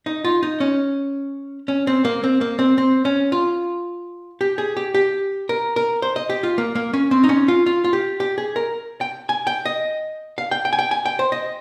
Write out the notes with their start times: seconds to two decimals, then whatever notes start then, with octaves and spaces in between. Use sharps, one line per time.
0.06 D#4
0.25 F4
0.43 D#4
0.60 C#4
1.68 C#4
1.87 C4
2.05 A#3
2.24 C4
2.41 A#3
2.59 C4
2.78 C4
3.05 C#4
3.32 F4
4.41 G4
4.58 G#4
4.77 G4
4.95 G4
5.49 A#4
5.76 A#4
6.02 C5
6.16 D#5
6.30 G4
6.43 F4
6.58 A#3
6.75 A#3
6.93 C#4
7.11 C4
7.24 D#4
7.29 C#4
7.48 F4
7.66 F4
7.84 F4
7.93 G4
8.20 G4
8.38 G#4
8.56 A#4
9.01 G5
9.29 G#5
9.47 G5
9.66 D#5
10.38 F5
10.51 G5
10.65 G5
10.73 G#5
10.79 G5
10.91 G#5
11.06 G5
11.19 C5
11.32 D#5